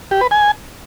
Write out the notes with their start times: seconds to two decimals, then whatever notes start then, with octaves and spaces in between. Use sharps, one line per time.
0.11 G4
0.21 B4
0.31 G#5